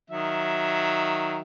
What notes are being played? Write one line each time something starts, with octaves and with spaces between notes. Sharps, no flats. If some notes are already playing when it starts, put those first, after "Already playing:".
D#3 F#3 E5